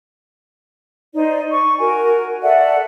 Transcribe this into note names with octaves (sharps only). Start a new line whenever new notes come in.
D#4 C5 D5
C#6
F#4 A#4 G#5
A4 D5 E5 F#5